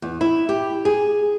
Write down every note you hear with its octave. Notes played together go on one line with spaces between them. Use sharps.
E2
E4
G4
G#4